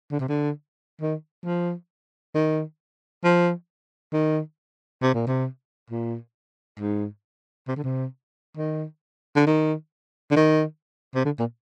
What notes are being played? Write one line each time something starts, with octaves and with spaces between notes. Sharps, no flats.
D3
C3
D3
D#3
F3
D#3
F3
D#3
C3
A#2
C3
A#2
G#2
C3
D3
C3
D#3
D3
D#3
D3
D#3
C3
D3
A#2